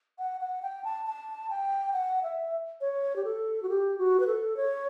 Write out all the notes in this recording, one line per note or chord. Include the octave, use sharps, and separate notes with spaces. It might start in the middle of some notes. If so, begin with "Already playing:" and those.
F#5
F#5
G5
A5
A5
G5
F#5
E5
C#5
G4
A4
F#4
G4
F#4
B4
A4
C#5